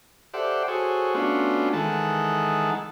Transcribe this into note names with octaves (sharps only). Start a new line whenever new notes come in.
G4 A4 C5 D5 E5 F#5
F#4 G#4 A4 C5 C#5
A3 B3 C#4 D4 F4 F#4
D#3 E3 G#3 A4 F#5 A5